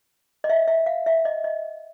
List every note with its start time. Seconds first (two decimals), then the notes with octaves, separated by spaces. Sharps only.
0.44 D#5
0.49 E5
0.68 E5
0.86 F5
1.06 E5
1.25 D#5
1.44 D#5